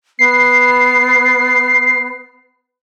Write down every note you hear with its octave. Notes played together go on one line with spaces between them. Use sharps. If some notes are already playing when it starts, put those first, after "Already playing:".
B3 C7